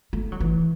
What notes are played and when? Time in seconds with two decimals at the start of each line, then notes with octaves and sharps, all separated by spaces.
0.13 A3
0.32 F#3
0.40 E3